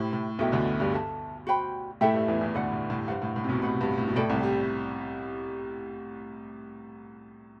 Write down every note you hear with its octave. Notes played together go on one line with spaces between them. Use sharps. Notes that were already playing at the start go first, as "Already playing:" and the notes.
Already playing: A2 E4 G4 C5
A2
B1 B2 E4 A4 E5 G5
D2 D3
G2 G3
A4 E5 A5
F#4 C5 G5 B5
A2 A3 E4 A4 E5 G5
G2 G3
E2 E3
E2 E3
D2 D3 B4 D5 F#5
A2
A2
G2 D4 A4 C5 F#5
A2
A2
C3
B1 B2
A2 B4 F#5 B5
G2
A2
B2
A2 E4 A4 D5 G5
C2 C3
G3